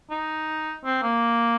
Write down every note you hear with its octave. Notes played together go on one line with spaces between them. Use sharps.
D#4
C4
A#3